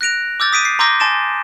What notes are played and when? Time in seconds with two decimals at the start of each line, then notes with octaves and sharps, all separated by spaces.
0.01 F#6 A#6 D7 F7
0.40 D6 E6 G6 A6
0.52 D#6 B6 D7 D#7
0.65 C7
0.79 A#5 C6 D6 E6 G6 A#6
1.00 G#5 A5 C6 A6 D7 E7